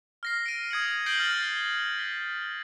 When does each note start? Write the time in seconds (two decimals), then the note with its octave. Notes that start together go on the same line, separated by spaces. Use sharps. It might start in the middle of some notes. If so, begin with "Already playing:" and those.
0.23 F6 A#6 C7
0.46 D7 D#7
0.71 D#6 G#6 C#7 F#7
1.06 G6 A#6 C7 D7 F#7 G7
1.20 F6 A6
1.99 B6